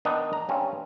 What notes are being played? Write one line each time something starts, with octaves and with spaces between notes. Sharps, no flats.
D#3 B3 D4 D#4
A#5
G2 C4 C#4